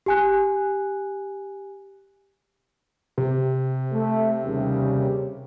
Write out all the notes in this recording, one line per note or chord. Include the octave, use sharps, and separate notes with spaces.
G4 G#5 F#6
C3
A3
D#2 C#3 G3